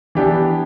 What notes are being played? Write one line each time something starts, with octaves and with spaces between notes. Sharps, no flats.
E3 B3 D4 G4